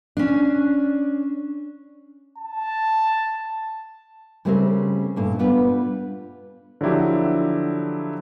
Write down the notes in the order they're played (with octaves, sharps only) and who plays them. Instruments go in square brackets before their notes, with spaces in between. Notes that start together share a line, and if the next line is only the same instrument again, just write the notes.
[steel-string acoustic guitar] C#4 D4
[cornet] A5
[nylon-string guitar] C#3 G3 A3 C4 C#4 A#4
G2 A#2 A3
G3 B3 D4 F4 B4
[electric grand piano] D3 F3 F#3 E4 G4